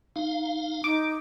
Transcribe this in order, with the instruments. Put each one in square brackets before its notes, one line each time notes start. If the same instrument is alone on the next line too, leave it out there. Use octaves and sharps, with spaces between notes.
[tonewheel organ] D#4 F5
[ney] D#4 [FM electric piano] D6